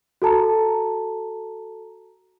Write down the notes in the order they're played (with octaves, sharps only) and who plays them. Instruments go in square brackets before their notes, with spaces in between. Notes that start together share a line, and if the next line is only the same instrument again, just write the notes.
[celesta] F#4 A4 A5 A#5